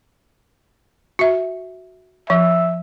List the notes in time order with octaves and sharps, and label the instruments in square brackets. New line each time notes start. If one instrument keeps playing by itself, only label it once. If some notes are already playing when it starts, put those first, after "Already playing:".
[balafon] F#4 E5
[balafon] F3 [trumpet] E5